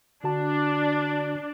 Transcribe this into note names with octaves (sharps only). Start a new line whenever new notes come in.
D3 D4 F#4 A5